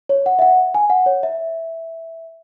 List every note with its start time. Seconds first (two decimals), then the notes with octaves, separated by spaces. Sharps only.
0.09 C#5
0.26 F#5
0.39 E5
0.42 F#5
0.75 G#5
0.90 F#5
1.06 C#5
1.23 E5